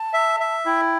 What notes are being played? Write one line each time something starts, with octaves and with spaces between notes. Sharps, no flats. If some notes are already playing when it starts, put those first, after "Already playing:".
Already playing: A5
E5
E5
E4 G5